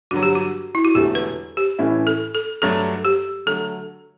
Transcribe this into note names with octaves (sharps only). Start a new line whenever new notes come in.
G2 D3 F#3 F#4
G4
F#4
E4
F#4
E1 E2 D3 A3 G4
B4
G4
A2 E3 A3 C#4 E4
A4
A4
G2 F#3 A3 D4 A4
G4
D3 F#3 A3 A4